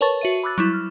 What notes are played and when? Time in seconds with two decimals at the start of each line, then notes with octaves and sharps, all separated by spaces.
0.01 A#4 B4 C#5 A5 C#6 A6
0.21 F#4 E5 D#7
0.43 B5 D6 E6 F#6 A6
0.58 F#3 G3 E4
0.74 F6